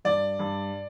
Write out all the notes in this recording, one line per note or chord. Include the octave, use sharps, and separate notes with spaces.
G2 D5
G2